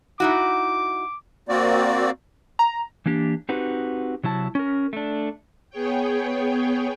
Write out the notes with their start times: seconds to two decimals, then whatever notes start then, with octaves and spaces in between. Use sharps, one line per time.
0.20 D#4 E4 F#4 D6
1.49 A#3 C4 F#4 D5
2.59 A#5
3.06 E3 A#3 D4 G4
3.49 C4 D#4 F#4 G4 B4
4.24 C3 F#3 E4 A5
4.55 C#4 A#4
4.93 A3 D4
5.70 B3 G#4 C#5 G5